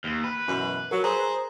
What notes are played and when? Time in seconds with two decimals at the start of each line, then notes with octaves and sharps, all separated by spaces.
0.04 D#2
0.24 B4
0.47 F#2 B2 E3
0.91 F#3 A#4
1.04 G#4 C5 A#5